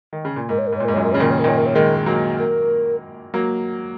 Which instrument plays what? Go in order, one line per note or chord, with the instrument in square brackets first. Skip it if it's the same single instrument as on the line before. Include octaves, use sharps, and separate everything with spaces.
[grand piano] D#3
C#3
A#2
[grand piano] G#2 [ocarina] A#4
[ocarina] C#5
A#4
[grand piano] G#2
[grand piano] A#2 [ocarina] C#5
[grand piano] G#2 [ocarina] A#4
[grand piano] F#2 A#2 [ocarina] C#5
[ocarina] A#4
[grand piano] C#3 [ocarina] C#5
[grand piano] A#2 D#3 [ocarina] A#4
[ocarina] C#5
A#4
[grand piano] A#2 D#3 [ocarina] C#5
[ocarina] A#4
C#5
[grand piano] D#3 G#3 [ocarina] A#4
[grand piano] F#3 A#3
[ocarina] A#4
[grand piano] F#3 A#3